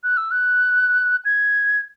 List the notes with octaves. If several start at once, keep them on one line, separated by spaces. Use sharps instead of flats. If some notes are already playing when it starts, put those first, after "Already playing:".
F#6
E6
F#6
G#6